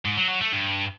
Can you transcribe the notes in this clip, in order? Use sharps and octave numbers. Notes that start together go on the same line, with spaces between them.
G#2
F#3
F#3
A3
G2